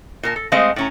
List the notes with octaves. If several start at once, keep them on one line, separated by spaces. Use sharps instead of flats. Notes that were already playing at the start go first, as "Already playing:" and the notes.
A#2 A#4 A5
A4
G#3 A3 C4 C5 D#5 F5
A2 C#4 A#5